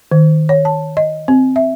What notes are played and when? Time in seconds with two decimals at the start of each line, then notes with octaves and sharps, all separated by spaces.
0.11 D#3
0.49 C#5
0.65 A5
0.97 D#5
1.28 C4
1.56 E5